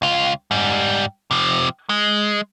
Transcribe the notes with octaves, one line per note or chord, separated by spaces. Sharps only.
C#2 F4
G#2 G3
C3 F3
G#3